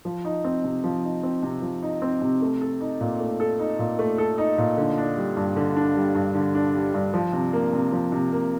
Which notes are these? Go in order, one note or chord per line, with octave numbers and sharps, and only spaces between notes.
F3
D#4
C4
C3
F3
D#4
C4
C3
F3
D#4
C4
C3
A3
A4
D#4
A#2
A3
A4
D#4
A#2
A3
A4
D#4
A#2
D3
D4
G3
G2
D3
D4
G3
G2
D3
D4
G3
G2
F3
C3
A#3
C3
F3
C3
A#3